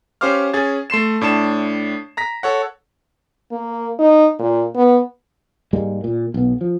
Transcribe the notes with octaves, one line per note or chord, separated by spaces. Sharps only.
C#4 G4 C5 F5 D6 F6
C#4 G#4 G#6 A6
A3 C6 C7 E7
A2 D4 A5 E7
A#5 A#6 B6
A4 C#5 F#5
A#3
D#4
A#2
B3
G#2 G3 G#3 A#3
A#2
B1 B3
F3